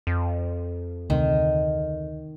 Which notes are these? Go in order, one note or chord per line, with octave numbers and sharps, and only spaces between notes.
F2
D2 C3 D#3